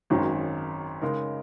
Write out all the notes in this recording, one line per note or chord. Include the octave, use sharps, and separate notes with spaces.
G#1 F#2 D#3 G#3 C#4
C#3 G#3 D#4 A#4